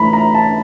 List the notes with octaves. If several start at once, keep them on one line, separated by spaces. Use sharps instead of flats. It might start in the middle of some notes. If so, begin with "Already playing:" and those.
Already playing: A2 E3 A3 A#5 B5
A#5
A5